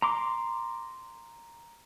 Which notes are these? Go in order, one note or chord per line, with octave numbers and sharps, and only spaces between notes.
A#5 C6 D6